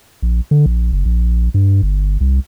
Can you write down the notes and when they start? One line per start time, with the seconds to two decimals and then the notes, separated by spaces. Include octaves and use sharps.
0.22 A#1
0.51 D3
0.66 A#1
0.93 F#1
1.05 A#1
1.54 G2
1.83 G1
2.21 C2